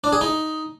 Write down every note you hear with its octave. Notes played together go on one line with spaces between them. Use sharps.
D4
G#4
D#4